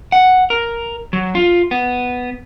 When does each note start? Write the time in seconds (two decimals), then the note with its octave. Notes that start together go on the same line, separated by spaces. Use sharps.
0.12 F#5
0.50 A#4
1.13 F#3
1.35 F4
1.71 B3